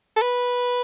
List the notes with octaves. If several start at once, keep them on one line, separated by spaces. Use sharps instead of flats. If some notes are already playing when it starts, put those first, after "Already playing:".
A4
B4